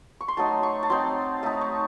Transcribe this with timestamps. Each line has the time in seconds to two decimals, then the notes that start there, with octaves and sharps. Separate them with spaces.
0.21 C#6
0.28 C6
0.37 F#3 A3 D#4 A5
0.63 C#6
0.83 A5
0.90 F#3 C4 D#4 C6
1.43 A3 D#4 A5
1.61 C#6